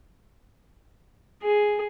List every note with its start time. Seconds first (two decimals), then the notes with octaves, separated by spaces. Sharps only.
1.42 G#4